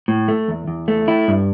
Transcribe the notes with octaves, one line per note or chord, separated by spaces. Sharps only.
A2
A3
E2
E2
A3
E4
G2